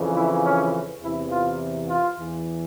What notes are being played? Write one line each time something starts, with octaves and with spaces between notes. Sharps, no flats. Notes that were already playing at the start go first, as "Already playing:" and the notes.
Already playing: F2 C#3 E3
E4
C#4
E2 C3 E3 E4
F4
F4
E2 E3